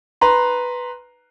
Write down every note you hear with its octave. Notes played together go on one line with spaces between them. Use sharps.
B4 A#5 C6